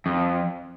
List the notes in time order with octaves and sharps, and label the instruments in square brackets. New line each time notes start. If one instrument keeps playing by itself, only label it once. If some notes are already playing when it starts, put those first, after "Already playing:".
[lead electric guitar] F2